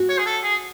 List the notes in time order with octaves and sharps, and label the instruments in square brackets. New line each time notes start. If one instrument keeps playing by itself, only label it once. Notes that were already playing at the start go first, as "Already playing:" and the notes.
Already playing: [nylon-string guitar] F#4
[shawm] C#5
G#4
A4
G#4